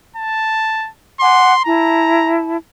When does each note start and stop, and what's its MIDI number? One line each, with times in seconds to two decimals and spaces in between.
0.16 0.89 81
1.20 1.53 78
1.20 1.53 80
1.20 1.62 84
1.20 1.53 86
1.65 2.56 64
1.65 2.56 81
1.65 2.38 82